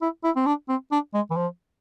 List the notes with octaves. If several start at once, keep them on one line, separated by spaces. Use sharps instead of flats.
E4
E4
C4
D4
C4
D4
G#3
E3
F3